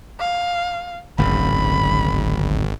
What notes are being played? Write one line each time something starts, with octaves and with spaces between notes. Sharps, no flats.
F5
D1 G#1 F#2 C#3 B5